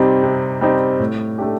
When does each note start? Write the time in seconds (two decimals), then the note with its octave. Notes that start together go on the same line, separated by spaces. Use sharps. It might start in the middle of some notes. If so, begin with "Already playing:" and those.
Already playing: C3 G3 C4 D#4
0.23 C3
0.61 G3 C4 D#4
0.99 A2
1.38 A3 D4 G4